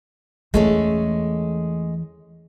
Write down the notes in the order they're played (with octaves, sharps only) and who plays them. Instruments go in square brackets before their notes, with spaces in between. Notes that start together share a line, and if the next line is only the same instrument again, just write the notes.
[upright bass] E2 E3 [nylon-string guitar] G#3 A3 C#4